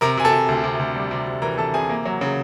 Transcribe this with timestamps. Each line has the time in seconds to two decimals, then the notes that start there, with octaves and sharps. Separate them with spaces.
0.01 C3 A#4 A#5
0.17 C3 G#5
0.25 A4 A5
0.32 C3
0.48 D2
0.64 C3
0.79 D2
0.96 G3
1.11 C3
1.27 C3
1.42 E3 A#4 A#5
1.58 E3 A4 A5
1.74 C3 G#4 G#5
1.90 A#3
2.05 F#3
2.21 C#3